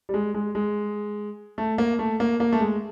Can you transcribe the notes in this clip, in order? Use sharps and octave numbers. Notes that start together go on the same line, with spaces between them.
G3
G#3
G#3
G#3
A3
A#3
A3
A#3
A#3
A3
G#3